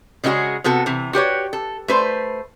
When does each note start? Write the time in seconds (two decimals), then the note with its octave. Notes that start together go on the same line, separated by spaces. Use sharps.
0.24 C#3 G#3 B3 E4 F#4 G#4
0.64 C3 B3 F#4 A4
0.86 C3 E3
1.13 F#4 G4 B4 C#5
1.53 A4
1.88 A3 B4 C5